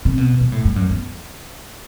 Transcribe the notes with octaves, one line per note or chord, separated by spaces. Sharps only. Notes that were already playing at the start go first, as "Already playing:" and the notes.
C3
B2
B2
A2
G2
F#2
E2